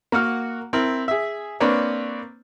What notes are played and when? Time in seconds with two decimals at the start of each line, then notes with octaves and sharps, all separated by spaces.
0.12 A#3 F#4 F#5 F6
0.73 C4 E4 A#4
1.08 G#4 E5
1.60 A#3 C4 D4 B4 C#5